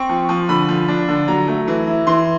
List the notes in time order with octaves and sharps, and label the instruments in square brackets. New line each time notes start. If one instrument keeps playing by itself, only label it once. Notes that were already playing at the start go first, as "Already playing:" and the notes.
Already playing: [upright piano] C4 C#6
F3
F3
D3 B5
F3
D4
D3
F#3 A#5
A3
E3
E4
E3 C6